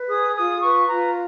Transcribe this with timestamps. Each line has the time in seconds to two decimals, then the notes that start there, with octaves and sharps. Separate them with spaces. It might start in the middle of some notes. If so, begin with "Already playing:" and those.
Already playing: B4
0.09 G#4 D#6
0.35 F4 D#6
0.62 B4 C#6
0.88 F4 A#5